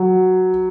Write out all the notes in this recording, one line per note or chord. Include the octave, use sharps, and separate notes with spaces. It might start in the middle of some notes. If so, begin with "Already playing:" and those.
Already playing: F#3